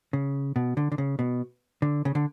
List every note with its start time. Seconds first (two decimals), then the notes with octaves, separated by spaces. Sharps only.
0.13 C#3
0.56 B2
0.77 D3
0.92 D3
0.98 C#3
1.19 B2
1.82 D3
2.05 C#3
2.15 D3